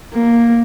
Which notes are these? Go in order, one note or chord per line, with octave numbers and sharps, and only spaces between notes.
A#3